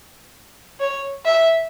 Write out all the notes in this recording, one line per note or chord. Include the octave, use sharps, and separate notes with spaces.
C#5
E5